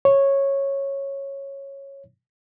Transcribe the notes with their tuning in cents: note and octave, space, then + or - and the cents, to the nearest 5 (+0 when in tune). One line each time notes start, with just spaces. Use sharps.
C#5 -10